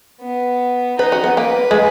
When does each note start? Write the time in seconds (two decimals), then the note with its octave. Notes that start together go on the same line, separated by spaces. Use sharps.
0.21 B3
0.98 D#4 B4
1.12 F#4
1.24 B3
1.37 A#3 B4
1.71 G#3